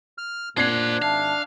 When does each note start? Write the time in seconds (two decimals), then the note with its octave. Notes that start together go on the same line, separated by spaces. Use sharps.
0.18 F6
0.57 A#2 D4 C5 F#5 G#6 C7
1.02 G#1 E5 F5 A5